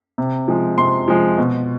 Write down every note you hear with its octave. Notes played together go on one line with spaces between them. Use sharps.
C3
F3 G#3
C3 C6
F3 G#3
B2